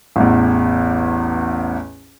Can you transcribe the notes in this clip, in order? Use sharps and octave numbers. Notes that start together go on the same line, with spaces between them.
A1 E2